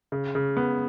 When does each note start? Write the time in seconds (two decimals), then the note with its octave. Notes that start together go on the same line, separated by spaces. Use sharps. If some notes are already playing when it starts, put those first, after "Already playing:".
0.12 C#3
0.35 C#3
0.57 B3